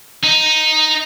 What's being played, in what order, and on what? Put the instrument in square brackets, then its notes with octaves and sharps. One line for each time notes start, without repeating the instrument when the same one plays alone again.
[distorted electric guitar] D#4